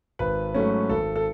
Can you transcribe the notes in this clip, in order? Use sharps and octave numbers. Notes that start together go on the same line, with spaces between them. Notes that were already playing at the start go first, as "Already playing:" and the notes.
G#1 B4
G#2 F#3 A3 C#4
G#1 A4
A4